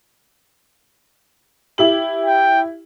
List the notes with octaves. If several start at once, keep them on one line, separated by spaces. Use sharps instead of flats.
E4 G4 F#7
G5